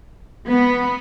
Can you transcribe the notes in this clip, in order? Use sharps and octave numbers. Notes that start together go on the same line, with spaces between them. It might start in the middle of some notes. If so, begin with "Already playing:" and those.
B3